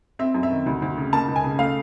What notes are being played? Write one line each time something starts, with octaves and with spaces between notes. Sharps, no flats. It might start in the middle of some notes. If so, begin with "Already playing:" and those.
C4 E5
F#2
E5
D#3
D2
D2
C#3
A#3 A5
C#2
G#5
C#3
A3 F5